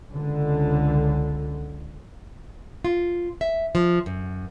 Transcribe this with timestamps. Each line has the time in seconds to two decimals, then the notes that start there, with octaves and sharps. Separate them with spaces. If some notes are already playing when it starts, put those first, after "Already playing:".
0.10 C#2 D3
2.85 F4
3.41 E5
3.75 F3
4.06 F#2